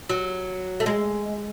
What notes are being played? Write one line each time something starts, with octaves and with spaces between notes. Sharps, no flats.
F#3
A3
G#3